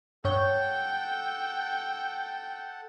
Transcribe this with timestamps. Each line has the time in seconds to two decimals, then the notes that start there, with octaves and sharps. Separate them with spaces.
0.25 G2 A4 C#5 F#5 G5 G6